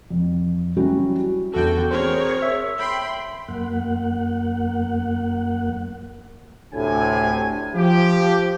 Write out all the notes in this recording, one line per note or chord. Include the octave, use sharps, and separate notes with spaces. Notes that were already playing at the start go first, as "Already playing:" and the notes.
F2
F#3 G3 C#4 E4 F#4
E2 D3 F#4 A4 G5
C4 G#4 A#4 C5 C#5
E5
G5 B5 C6
F#2 A#3 F#5
D2 A2 C3 G#5
F3 G4